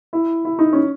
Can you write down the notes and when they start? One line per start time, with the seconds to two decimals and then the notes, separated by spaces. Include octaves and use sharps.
0.13 E4
0.45 E4
0.59 D#4
0.73 C#4